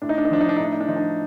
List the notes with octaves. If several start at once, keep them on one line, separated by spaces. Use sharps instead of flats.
A2 D4
D#4
D4
D#4
F3 D4
D#4
D4
D#4
A2
D4
D#4
D4
F3 D#4
D4